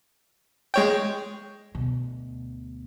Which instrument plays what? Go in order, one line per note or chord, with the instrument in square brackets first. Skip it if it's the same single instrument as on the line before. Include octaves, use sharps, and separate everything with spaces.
[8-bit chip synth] G#3 C#5 G5
[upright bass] D2 B2